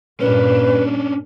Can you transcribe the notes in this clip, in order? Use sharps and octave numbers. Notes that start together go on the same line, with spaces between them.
G2 A#2 C#4 D4 B4